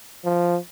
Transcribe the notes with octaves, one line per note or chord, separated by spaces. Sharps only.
F3